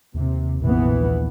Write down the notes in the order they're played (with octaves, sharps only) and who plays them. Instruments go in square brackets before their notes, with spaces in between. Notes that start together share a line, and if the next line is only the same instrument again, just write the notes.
[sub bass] D#2 [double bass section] C3
[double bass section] A#1 E3 B3 [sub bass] F2
[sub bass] D#2